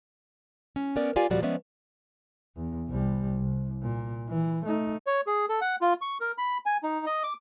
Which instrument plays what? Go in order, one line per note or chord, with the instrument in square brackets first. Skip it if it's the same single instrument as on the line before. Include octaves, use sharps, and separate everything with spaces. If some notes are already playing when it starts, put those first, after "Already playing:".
[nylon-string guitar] C#4
B3 C#4 A#4 D5
F4 G4 D5 F5 G#5
D#2 A#2 F3 G3 F#4 D5
F3 G#3 B3 C#4 D5 E5
[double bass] E2
C2 G3
C2
A#2
E3
A3 D#4
[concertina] C#5
G#4
A4
F#5
F4
C#6
A#4
B5
G#5
D#4
D#5
D6